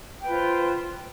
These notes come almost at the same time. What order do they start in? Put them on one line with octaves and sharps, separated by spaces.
G5 B4 F4 C5